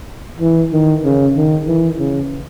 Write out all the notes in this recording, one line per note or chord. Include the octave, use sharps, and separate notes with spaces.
E3
D#3
C#3
D#3
E3
C#3